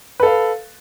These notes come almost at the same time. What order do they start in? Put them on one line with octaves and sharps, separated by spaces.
B4 A4 F5